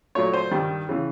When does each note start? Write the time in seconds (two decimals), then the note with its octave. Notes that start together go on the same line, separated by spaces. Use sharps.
0.15 A#2 F#3 A3 C#5
0.33 C5
0.51 G2 D#3 G3
0.89 C#3 E3